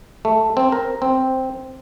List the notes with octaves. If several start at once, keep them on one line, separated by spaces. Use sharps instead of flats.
A3
C4
A#4
C4